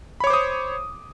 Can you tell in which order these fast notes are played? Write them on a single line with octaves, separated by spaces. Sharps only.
B5 C#5 D6 C5 D#6